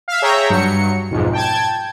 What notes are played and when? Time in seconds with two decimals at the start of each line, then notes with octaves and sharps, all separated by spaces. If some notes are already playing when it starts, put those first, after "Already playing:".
0.08 E5 F5
0.22 G#4 C#5 E5 G5 A#5
0.50 G2 F#3 C#7
1.11 B1 F2 G#2
1.33 G5 A5 G#6